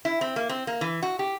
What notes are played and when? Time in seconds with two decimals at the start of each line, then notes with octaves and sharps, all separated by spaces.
0.05 E4
0.21 C4
0.36 A#3
0.49 C4
0.67 A#3
0.81 E3
1.03 F#4
1.19 G4